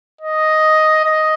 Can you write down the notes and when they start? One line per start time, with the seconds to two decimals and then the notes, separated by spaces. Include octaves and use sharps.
0.21 D#5
1.04 D#5